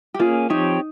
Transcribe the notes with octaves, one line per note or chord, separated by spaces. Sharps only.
G4
A#3 C#4 F4 G#4
F3 C4 D#4 G4 C#5